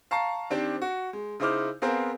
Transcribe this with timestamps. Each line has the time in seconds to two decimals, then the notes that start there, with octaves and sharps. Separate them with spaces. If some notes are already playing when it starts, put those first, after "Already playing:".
0.11 F5 A5 A#5 C#6 C7
0.50 D#3 C4 D4 G4 C5
0.82 F#4
1.13 G#3
1.40 C#3 D#4 E4 C5 D6 F6
1.82 B3 C4 G#4 A#4 C5 F5